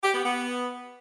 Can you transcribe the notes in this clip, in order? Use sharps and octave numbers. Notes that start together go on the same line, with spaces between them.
G4
B3
B3